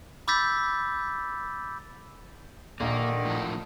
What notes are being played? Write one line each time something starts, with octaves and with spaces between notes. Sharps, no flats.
B5 D6 E6 G6 A6 B6
A#1 D3 D#3 A#3
A2 F3 D4